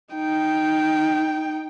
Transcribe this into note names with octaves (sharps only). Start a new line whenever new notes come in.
D#4 G5